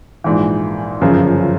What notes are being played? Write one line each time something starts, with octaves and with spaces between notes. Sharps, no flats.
A#1 G#2 E3
G1 F#2 C#3 F3